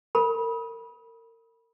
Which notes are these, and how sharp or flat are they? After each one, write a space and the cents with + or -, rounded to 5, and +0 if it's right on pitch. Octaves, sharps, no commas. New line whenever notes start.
A#4 -35 B5 -25